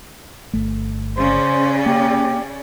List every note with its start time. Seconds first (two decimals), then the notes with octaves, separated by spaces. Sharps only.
0.53 G1 A3
1.17 C#3 C#4 C5 D5
1.86 A#3 G4